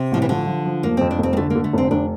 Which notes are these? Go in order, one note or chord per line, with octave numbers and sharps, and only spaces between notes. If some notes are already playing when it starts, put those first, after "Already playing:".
Already playing: C3
A1 F3
E3
D3 F3
F3
F3
F1 A#3
F2 C4
D4
F1 C4
A#3
D3 A3
A#3
D3
A3
F1 C4
F1 D4